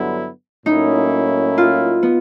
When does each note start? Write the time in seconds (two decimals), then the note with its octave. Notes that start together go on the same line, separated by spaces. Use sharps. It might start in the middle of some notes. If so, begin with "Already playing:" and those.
Already playing: G2 D3 F#3 B3 E4
0.66 A2 F#3 A#3 C#4 D#4 E4
1.58 F4
2.03 B3